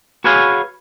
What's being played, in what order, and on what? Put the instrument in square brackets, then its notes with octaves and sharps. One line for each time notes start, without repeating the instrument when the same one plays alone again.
[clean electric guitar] F#4 G#4 B4 C#5 F5 G#5